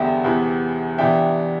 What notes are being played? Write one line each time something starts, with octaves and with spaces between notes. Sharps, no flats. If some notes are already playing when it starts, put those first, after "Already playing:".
Already playing: E2 D3 G3 B3 D4 E5 G5
E2 C3 E3 B3 E4
C3 E3 B3 D4 E5 G5